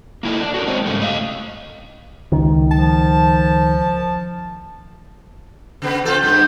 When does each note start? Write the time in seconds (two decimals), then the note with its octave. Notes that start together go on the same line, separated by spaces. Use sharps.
0.23 A#3 E4 A4 D#5
0.40 D4
0.54 F#4 A4 A#4
0.67 G#3 C4 C#4 C5 D#5
0.86 G#2 C#3 G3 A3
1.01 D#5 F5
2.32 C#2 D#3
2.71 F3 A5
5.82 C#3 B3 B4
6.05 C4 F4 A4 G6
6.23 G2 B3